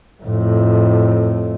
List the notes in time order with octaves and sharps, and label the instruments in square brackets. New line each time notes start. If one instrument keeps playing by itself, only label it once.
[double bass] F2 A2